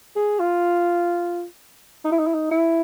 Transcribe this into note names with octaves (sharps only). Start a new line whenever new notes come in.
G#4
F4
D#4
E4
D#4
E4
D#4
E4